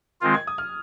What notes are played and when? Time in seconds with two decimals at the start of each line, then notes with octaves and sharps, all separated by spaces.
0.21 D#3 G#3 C4 F4
0.34 G#6
0.47 D#6
0.58 F6